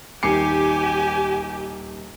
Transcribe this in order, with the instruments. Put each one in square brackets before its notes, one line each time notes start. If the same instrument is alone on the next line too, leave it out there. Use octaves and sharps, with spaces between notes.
[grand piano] D#1 D6 C7 [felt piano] D#3 C#7 [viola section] G4 [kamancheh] G#5